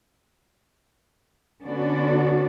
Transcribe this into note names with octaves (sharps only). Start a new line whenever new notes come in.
D3 B3 C#4 D4 F#4 D5